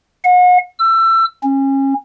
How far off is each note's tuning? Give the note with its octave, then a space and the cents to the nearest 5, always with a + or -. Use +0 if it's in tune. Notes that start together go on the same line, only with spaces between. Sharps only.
F#5 -40
E6 +25
C#4 -30